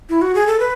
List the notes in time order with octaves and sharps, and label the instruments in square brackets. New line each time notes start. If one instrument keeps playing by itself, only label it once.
[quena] E4
F#4
G#4
A4
B4